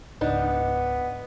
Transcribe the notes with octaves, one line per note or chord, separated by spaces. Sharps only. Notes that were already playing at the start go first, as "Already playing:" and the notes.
C#2 G#2 B3 D4 D#4